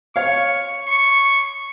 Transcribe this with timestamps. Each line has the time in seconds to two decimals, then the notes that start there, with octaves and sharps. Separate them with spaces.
0.16 C#5 F5 C#6
0.88 C#6